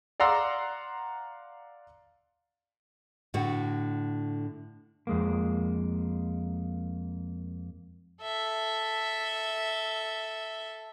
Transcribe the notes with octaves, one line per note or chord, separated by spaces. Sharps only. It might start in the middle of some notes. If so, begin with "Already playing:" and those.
D5 F5 F#5 A#5 C6 E6
A2 D3 F#4
F2 G#3 A#3
A4 E5